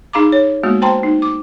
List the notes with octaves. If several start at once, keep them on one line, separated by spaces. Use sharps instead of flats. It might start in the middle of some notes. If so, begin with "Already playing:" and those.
D#4 G#4 F5 A#5 B5 D6
C#5
G#3 A#3 B3 F#4
C5 G5 A5 A#5 C6
D#4
D6